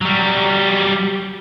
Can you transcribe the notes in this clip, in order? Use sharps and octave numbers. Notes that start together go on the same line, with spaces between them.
F#3 G3